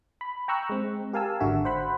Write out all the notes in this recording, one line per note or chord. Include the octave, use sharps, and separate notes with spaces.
B5
G5 A#5 C#6 E6 F#6
G#3 C4
G4 A#4 F5 G#5 A5 E6
G#1 D3 F#4 E5
C5 F#5 B5